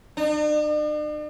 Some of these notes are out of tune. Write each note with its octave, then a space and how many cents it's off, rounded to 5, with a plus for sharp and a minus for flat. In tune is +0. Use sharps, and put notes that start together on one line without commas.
D4 +45